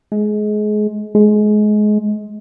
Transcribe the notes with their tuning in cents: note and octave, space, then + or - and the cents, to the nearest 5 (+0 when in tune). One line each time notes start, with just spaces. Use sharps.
G#3 +25
G#3 +25